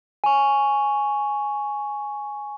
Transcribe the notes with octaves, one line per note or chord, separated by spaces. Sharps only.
G#5 C#6